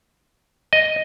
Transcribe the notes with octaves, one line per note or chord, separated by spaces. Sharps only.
D#5